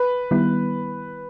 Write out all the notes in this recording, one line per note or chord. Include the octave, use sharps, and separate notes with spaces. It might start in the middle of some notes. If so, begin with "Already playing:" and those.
Already playing: B4
D#3 G3 B3 E4